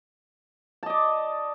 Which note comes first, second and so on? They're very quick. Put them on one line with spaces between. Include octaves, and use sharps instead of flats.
A5 D#5 D5